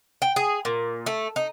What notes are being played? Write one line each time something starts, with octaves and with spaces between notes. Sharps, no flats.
G5
G#4
A#2
A3
D#4